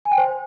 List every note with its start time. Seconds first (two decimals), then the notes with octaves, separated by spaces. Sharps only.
0.05 G#5
0.12 G5
0.18 C5